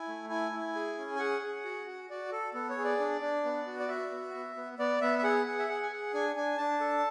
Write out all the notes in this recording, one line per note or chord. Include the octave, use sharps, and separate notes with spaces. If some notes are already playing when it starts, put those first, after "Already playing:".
Already playing: E4 G#5
A3
E4 G#5
E4
G#4
C#4
G#5
G#4 F#5
G#4
F#4
F#4
F#4 D5
A4
B3 A4
C#5
G#4
D5
D4
D4
B3
F#4
D5
F#4 E5
B3
B3
B3
B3 D5
B3 E5
E5
G#4 F#5
G#4
E5
G#4 F#5
G#5
G#4 F#5
D4 G#5
D4 G#5
D4 A5
A4